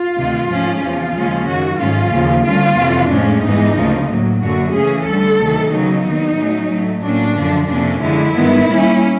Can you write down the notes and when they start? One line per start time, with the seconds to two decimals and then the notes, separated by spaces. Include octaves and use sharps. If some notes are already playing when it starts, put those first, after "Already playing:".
Already playing: F4
0.16 D2 C3 D#3
0.49 G#2 F3 A3 C#4
0.81 E2 C3 F3 F4
1.15 D#2 C#3 F3 G#3 C#4
1.47 F#2 D#3 F#3 F#4
1.80 G#2 D#3 F#3 A3 C#4 F4
2.13 D#2 C#3 F3
2.45 D2 D3 G3 A#3 C#4 F4
2.78 F2 C3 E3
3.10 A2 F3 G#3 C#4 D4
3.43 G#2 E3 G#3 B3 D#4
3.76 D2 C#3 F3 A#3
4.08 A2 F#3 A#3
4.41 F#2 D3 F#3 A#3 F#4
4.74 C#3 E3 A3 C#4 G#4
5.07 D2 D3 G3 A4
5.40 D2 C3 D#3 F#3 A3
5.73 C#3 F#3 B3 D#4
6.05 D#2 D#3 F#3
6.37 A2 F#3 A3 C#4
6.71 A2 F#3 A3
7.03 A2 F#3 A#3 C#4 D4
7.36 F#2 D3 F3
7.69 F2 C3 F3 A#3 C#4 D4
8.01 F#2 D3 F3 G#3 E4
8.34 G2 D#3 G#3 B3
8.67 A#2 G3 A#3 C#4